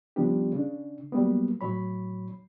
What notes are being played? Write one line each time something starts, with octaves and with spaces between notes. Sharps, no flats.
C#3 F3 G3 B3 D4 G4
C#3 D4
F#3 G3 A#3 B3
A2 F#3 C#5 B5